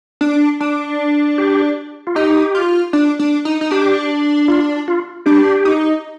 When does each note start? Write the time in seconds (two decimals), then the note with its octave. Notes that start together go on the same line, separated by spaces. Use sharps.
0.21 D4
0.60 D4
1.38 G4
2.07 F4
2.15 D#4 G4
2.55 F4
2.93 D4
3.19 D4
3.45 D#4
3.61 D#4
3.71 D4 G4
4.48 F4
4.88 F4
5.26 D4 G4
5.65 D#4